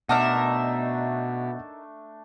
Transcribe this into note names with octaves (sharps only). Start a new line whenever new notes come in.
B2 A3 D4 D#4 A#4 E5 F#5